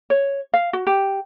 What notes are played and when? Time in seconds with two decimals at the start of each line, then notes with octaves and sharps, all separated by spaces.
0.10 C#5
0.54 F5
0.73 F#4
0.87 G4